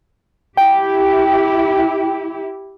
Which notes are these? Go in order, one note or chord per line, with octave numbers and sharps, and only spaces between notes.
E4 G4 G5